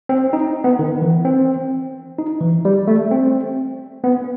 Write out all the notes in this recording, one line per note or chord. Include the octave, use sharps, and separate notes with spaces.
C4
D#4
B3
D#3
E3
C4
D#4
E3
G3
A3
C4
B3